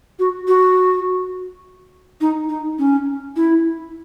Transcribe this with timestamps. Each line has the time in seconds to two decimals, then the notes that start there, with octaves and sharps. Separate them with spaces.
0.19 F#4
0.48 F#4
2.21 D#4
2.49 D#4
2.79 C#4
3.36 E4